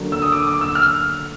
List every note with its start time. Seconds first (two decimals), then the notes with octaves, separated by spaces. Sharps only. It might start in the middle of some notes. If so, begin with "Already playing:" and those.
Already playing: D3 F#3 A#3
0.12 E6
0.22 D#6
0.32 D6
0.47 D6
0.61 E6
0.75 F6